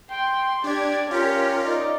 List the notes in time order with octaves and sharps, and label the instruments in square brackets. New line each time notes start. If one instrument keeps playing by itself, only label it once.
[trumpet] G5 [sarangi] C6
[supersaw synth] D4 G#6 [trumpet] G4 [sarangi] D5
[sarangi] C#4 [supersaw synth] F4 A#4 [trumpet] G4
[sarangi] D#4 [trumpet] D5